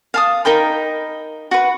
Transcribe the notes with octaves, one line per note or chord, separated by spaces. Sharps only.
F5 A5 D#6
D#4 A#4 G5 B5
F#4 B4